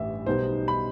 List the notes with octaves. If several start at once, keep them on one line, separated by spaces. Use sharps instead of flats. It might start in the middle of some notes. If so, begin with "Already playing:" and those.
Already playing: A1 G2 E3 E5
B1 B2 G3 B3 D#4 C5
B5